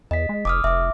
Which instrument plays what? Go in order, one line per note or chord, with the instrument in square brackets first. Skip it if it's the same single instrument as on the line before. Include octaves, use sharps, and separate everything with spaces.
[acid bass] E2 [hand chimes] D#5 B6
[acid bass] G#3
[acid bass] F1 [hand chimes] D6 D#6 F6
[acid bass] F1 [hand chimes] E5 D6